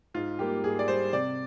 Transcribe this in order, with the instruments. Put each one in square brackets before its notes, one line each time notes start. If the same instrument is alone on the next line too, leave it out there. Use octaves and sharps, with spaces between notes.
[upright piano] G#2 [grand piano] F4
[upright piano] G3 A#3 [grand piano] G4
[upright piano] G#2 [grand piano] G#4
[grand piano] D5
[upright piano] G3 A#3 [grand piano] C5
[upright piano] C3 [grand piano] D5